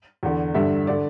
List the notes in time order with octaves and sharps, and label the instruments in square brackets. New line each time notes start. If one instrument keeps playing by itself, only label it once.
[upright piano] E2 D3
G2 D3 E5
D3 D5